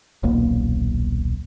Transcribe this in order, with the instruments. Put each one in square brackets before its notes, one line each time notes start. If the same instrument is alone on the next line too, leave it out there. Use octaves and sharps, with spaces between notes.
[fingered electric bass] D#1 B1 A#3